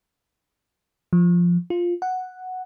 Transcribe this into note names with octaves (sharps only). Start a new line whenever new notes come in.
F3
F4
F#5